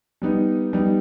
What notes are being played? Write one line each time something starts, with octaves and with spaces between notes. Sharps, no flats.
G3 B3 D#4
G3 B3 D#4